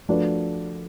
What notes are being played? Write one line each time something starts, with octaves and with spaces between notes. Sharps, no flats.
F3 A3 D4 F#4 B4